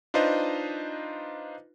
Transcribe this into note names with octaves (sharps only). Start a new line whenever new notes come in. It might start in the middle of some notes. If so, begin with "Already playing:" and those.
D4 D#4 F4 B4 C5 D#5